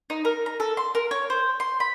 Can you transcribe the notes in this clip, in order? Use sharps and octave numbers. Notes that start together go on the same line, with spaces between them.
D#4
A#4
A#5
A4
C6
A#4
C#5
C5
C6
B5